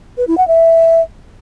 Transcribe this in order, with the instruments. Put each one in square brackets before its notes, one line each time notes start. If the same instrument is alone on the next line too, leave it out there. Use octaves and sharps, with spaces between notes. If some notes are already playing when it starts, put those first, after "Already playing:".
[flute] B4
E4
F#5
E5